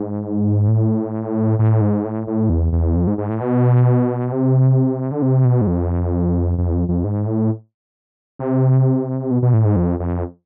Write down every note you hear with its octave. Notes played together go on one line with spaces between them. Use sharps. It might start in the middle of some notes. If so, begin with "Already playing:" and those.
Already playing: G#2
A2
A2
G#2
A2
A2
E2
E2
F2
G#2
G#2
A2
B2
C3
D3
C3
B2
G#2
F2
F2
E2
F2
F2
G#2
A2
C3
B2
B2
A2
G#2
F2
F2